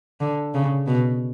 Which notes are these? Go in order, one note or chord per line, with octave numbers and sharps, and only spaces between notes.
D3
C#3
B2